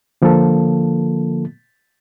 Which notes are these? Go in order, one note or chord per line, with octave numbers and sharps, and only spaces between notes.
D3 F3 A#3 F4 A4